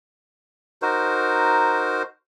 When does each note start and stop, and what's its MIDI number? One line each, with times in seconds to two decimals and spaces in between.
0.82 2.03 63
0.82 2.03 66
0.82 2.03 70
0.82 2.03 72